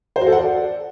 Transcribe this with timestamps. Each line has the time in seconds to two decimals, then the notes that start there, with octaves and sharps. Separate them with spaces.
0.16 C5
0.21 F#4
0.27 A4
0.32 F#5
0.38 D5